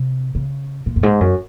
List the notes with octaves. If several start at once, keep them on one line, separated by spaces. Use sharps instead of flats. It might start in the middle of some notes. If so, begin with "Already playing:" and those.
Already playing: C3
C#3
A#2
F#2
G#2
F#2